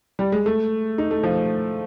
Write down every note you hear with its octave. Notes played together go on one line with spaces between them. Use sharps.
G3
G#3
A3
D#4
A3
F3